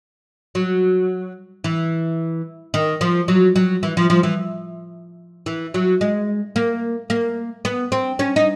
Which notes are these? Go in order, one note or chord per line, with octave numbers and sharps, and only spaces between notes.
F#3
E3
D#3
F3
F#3
F#3
E3
F3
F3
E3
E3
F#3
G#3
A#3
A#3
B3
C4
C#4
D#4